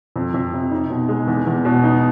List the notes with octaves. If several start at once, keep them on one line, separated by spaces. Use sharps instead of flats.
F2
F2
C3
D#4
B2
G#3
E2
E2
B2
D#4